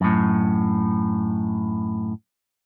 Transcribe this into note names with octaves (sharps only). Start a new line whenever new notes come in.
F#2 A2